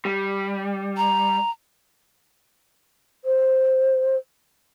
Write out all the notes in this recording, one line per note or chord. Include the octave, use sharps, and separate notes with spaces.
G3
A#5
C5